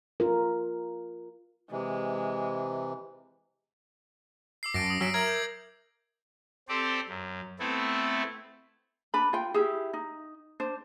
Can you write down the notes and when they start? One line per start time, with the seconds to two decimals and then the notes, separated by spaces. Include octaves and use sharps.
0.20 F4 A#4
1.71 C3 E3 G#3
4.63 D6 E6 C7
4.74 F#2 A5 A#6 D7
4.87 D#6 A#6
5.01 F#3 C#4 E5 E6 D7
5.14 A#4 E5 G#6 D7 F#7
5.27 G6
6.69 C4 G4 A4 C5 D5
7.09 F#2
7.59 A3 B3 C4 E4 A4
9.14 D4 B4 B5
9.33 F4 G5
9.54 E4 G4 G#4
9.93 D#4
10.60 D4 C5